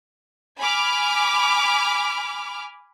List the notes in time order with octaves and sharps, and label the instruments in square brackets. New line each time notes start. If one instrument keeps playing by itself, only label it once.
[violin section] G#5 B5 D6 F6